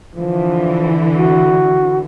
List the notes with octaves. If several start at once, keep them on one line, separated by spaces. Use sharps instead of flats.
D3 E3 F3
F#4